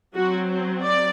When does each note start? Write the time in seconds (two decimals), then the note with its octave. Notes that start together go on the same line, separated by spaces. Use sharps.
0.15 F#3 C4 F#4
0.82 D5